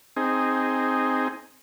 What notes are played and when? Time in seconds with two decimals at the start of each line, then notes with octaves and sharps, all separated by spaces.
0.16 C4 D#4 G#4